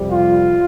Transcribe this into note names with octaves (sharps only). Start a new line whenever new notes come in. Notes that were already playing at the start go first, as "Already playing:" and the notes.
Already playing: F2 C3 G3
F4